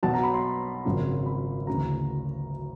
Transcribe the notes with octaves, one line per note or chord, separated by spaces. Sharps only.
B1 B2 F#3 A5
A#5
B5
C6
G#1 F#2 C#3 F3
B5
D2 C#3 E3 A#5